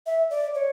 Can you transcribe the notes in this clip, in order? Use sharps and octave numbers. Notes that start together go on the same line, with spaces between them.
E5
D5
C#5